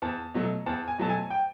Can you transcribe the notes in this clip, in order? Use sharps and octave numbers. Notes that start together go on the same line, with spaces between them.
E2 A5
B2 F#3 A3
E2 A5
G#5
B2 F#3 A3 A5
G#5
G5